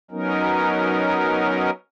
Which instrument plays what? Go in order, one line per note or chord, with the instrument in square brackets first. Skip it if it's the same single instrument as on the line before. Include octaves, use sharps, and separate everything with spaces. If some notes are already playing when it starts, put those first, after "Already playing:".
[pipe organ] F#3 B3 C#4 D#4 A#4